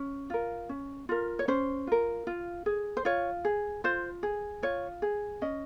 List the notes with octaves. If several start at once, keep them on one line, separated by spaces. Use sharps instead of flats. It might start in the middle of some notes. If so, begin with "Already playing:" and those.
Already playing: C#4
F4 A#4
C#4
F4 A#4
C#5
C#4 C5
F4 A#4
F4
G#4
C5
F4 C#5
G#4
F4 C5
G#4
F4 C#5
G#4
C#4 D#5